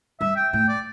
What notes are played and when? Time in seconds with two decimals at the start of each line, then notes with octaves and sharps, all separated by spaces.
0.20 G2 E5
0.36 G5
0.53 A2 G5
0.69 D5